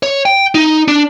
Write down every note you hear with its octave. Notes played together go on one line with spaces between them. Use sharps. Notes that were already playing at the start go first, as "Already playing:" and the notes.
C#5
G5
D#4
D4